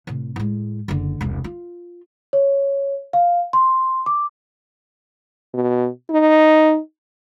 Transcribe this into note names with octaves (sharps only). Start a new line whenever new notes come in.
A2 C3
A2 G#3
F#1 D3
E1 C2
F4
C#5
F5
C6
D6
B2
D#4